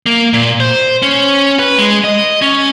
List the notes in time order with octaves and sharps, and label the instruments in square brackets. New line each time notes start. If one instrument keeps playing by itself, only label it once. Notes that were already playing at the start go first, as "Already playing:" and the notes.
[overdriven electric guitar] A#3
A#2
C5
C#4
B4
G#3
D#5
C#4